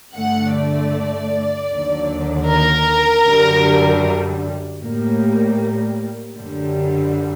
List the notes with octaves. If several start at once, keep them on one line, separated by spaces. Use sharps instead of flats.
G2 D3 A3 F#5
D5
D#2 D3 F#3
A#4
F#2 D3 G3
A2 G3 A#3
F#2 D3 G3